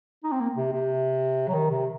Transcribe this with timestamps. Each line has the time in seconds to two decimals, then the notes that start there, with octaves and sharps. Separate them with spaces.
0.24 D#4
0.32 C4
0.40 A#3
0.56 C3
0.72 C3
1.48 F#3
1.54 D#3
1.70 C3